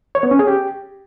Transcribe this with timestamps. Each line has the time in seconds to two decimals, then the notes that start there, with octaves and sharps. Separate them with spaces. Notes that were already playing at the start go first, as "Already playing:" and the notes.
0.15 C#5
0.23 B3
0.31 C#4
0.39 G#4
0.47 G4